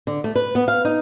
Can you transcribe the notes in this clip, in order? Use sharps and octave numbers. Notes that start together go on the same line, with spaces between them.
D3
A3
B4
B3
F5
D#4